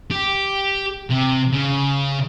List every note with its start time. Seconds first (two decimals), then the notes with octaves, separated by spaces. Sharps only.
0.11 G4
1.10 C3
1.52 C#3